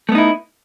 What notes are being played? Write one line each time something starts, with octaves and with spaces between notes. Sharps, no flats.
A3 B3 D#4 E4